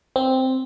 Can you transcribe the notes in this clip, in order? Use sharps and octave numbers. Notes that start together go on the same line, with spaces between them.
C4